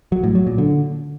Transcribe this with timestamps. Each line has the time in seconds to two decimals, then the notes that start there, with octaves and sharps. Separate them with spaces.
0.12 F#3
0.24 A2
0.35 F#3
0.47 A#2
0.58 D3